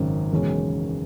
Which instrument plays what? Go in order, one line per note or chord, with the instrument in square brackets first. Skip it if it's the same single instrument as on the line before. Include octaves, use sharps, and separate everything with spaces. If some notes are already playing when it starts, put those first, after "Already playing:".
Already playing: [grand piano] G#1 F#2 C#3
F#1 E2 B2 G#3 C#4